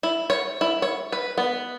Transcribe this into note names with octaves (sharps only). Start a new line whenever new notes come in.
E4
C#5
E4
C#5
B4
B3